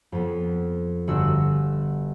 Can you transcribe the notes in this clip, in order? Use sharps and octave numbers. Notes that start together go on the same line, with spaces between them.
F2 B3
G1 F#4 E6